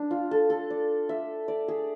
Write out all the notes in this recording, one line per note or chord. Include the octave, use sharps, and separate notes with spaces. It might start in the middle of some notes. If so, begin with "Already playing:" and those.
Already playing: D4
F4
A4
A4
D5
E5
D5
G#4